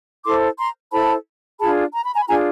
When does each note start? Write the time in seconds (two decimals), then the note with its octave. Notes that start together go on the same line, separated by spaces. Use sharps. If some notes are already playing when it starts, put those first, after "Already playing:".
0.24 E4 A4 C5 C6 D6
0.58 A#5 C6
0.92 E4 A4 C5 A5 B5
1.60 D4 F4 G#4 A5 B5
1.94 A#5
2.04 B5
2.14 G#5 A#5
2.22 B5
2.28 D4 F4 G#4 G#5 A#5